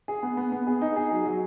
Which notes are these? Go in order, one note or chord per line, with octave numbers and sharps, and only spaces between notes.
G#4
B3
B3
B3
G#4
D#4
G#4
F#3
F#3